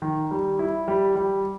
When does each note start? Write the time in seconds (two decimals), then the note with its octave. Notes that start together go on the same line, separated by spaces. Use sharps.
0.02 D#3
0.31 G3
0.59 E4
0.88 G3
1.16 G3